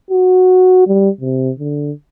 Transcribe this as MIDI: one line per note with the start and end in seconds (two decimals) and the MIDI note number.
0.11 0.85 66
0.87 1.09 55
1.21 1.51 48
1.59 1.92 50